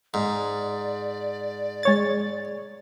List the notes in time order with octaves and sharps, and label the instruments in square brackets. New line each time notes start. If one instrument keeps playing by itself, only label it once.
[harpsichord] G#2 [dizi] D5
[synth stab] G#3 C#5 A6